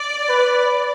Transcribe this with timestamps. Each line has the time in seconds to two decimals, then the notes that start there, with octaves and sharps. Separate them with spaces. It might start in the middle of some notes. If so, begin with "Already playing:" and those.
Already playing: D5
0.29 B4